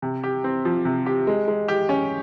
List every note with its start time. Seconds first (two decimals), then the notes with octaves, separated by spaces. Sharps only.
0.02 C3
0.23 G4
0.44 C4
0.65 F3
0.85 C3
1.06 G4
1.27 G#3
1.48 G#3
1.68 G4
1.89 C#4